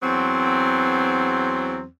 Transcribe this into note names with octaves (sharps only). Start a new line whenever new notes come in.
E2 F#3 C4